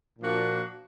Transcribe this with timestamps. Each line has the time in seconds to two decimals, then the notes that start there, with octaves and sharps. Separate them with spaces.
0.19 A#2 F3 A#3 D4 F#4